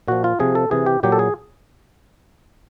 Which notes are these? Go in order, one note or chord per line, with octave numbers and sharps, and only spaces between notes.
A#2 F3 F#4
F4
C3 F3 G#4
A4
C3 E3 G#4
G4
A#2 F#3 G4
A4
G#4